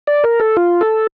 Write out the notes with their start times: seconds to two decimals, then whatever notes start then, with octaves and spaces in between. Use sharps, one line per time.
0.07 D5
0.24 A#4
0.40 A4
0.57 F4
0.81 A4